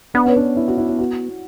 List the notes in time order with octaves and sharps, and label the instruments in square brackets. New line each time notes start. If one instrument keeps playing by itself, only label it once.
[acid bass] B3 [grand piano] D4
[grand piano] C#4
D4
E4
F#4
E4
E4
F#4